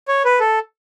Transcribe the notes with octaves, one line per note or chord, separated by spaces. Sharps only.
C#5
B4
A4